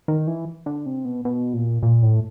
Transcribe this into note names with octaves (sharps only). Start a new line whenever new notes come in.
D#3
E3
D3
C3
B2
B2
A#2
A#2
A2